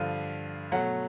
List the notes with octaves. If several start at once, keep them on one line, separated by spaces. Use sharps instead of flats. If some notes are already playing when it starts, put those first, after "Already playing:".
Already playing: G2 D3 F3 F5
B2 F#3 A3 F#5